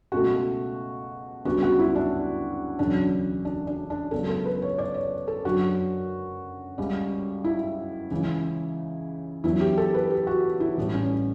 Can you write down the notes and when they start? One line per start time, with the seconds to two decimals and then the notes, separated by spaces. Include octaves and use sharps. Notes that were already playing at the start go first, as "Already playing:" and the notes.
0.12 C#2 B2 A3 F#4
1.45 D2 C#3 G3 B3 F#4
1.63 F#4
1.79 E4
1.96 D4
2.79 E1 D2 C#3 F#3 D4
3.45 D4
3.67 D4
3.90 D4
4.11 C#2 C#3 F#3 B3 A4
4.28 A4
4.46 B4
4.62 C#5
4.78 D5
4.94 C#5
5.28 A4
5.45 F#2 D3 F#3 F#4
6.78 C#2 C#3 G3
7.44 E4
8.11 C#2 C#3 E3
9.44 E2 D3 F#3 B3 E4
9.61 G4
9.78 A4
9.94 B4
10.10 G4
10.27 F#4
10.60 E4
10.77 A1 A2 G3
10.94 C#4